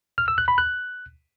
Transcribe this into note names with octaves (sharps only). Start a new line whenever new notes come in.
F6
E6
F#6
B5
F#6